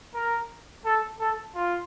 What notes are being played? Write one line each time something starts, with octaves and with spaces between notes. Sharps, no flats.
A#4
A4
A4
F4